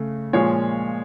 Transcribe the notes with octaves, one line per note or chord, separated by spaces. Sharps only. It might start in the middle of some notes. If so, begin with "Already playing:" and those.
Already playing: C#3 A3
A#2 F3 G#3 C#5